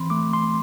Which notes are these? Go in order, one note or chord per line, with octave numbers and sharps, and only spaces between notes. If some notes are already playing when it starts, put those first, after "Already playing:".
Already playing: E3 C4 B5 C6
A3 D6
C6